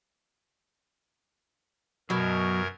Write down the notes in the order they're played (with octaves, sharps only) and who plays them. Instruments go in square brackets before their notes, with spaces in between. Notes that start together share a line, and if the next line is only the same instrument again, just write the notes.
[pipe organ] F#2 A#4 G#6 [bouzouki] B2 [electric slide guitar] F#3